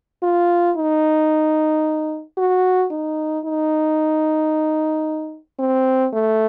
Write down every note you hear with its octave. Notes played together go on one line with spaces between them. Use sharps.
F4
D#4
F#4
D#4
D#4
C4
A3